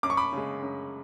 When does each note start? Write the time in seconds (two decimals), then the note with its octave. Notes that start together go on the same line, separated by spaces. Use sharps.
0.03 F#2 D6
0.10 C#6
0.17 B5 D6
0.33 C#3 G#3
0.62 F#2